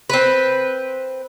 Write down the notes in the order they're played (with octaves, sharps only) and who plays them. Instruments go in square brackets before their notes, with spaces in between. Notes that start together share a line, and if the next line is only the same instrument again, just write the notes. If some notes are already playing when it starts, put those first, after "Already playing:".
[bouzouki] C4 B4